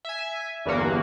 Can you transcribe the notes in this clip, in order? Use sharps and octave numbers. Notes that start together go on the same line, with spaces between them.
E5 G#5
G1 E2 G2 A#3 F#4